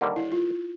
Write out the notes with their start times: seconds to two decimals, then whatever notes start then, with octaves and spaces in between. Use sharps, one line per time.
0.01 D#2 D3 G3 A#3
0.16 E4
0.32 F4